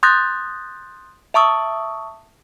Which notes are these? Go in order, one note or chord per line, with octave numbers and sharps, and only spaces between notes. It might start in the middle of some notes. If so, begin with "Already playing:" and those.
C6 D#6 F#6 G6 A6 A#6
E5 A5 C#6 D#6 E6